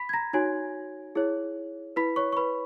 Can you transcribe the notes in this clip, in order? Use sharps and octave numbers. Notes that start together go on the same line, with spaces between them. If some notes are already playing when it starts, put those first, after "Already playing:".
Already playing: B5 B6
G#6
A#5 A#6
D#4 F#4 C#5 G#5 G#6
E4 G#4 C#5
E4 B4 B5 B6
C#5 C#6
C#6
B4 B5